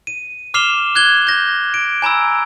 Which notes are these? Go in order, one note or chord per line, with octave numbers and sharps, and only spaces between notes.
D#7
D6 F6 C7 E7 F7 G7
F#6 G#6 G7
G6 A#6
D7
G#5 A#5 B5 E6